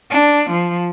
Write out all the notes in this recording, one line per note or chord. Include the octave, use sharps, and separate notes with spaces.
D4
F3